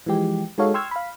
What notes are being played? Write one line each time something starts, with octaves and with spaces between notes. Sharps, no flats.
E3 F3 G#3 G4
G#3 D#4 F#4 A4 C#5 F5
G5 C6 C#6 E6 F6 G#6
F5 B5